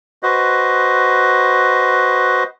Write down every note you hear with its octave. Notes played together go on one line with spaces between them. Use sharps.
F#4 B4 C5 D#5